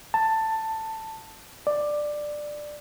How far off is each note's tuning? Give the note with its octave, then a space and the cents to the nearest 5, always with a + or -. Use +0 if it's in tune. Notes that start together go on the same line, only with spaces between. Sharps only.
A5 +10
D5 +10